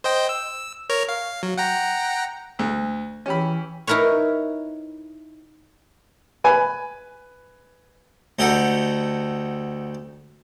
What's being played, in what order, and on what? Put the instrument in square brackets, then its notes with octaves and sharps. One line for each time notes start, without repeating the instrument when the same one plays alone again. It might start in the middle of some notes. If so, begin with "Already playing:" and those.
[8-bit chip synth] C5 D#5 G5
E6
A#4 C#5 A#5
F5
F#3
F#5 G5 A#5
[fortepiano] D2
[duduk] E3 [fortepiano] C#4 G4 B5
[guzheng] D#4 E4 A#4 B4 C#5
[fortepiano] B4 G#5
[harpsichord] D2 D#4 G4 A4 F#5